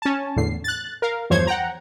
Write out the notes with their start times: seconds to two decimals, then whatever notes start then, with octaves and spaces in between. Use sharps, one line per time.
0.02 C#4 A5
0.36 E2 A2 D3 C7
0.64 F#6 A6
1.02 A#4 F5
1.30 E2 G2 F3 C5 C#5 G#6
1.47 F#5 G5 A#5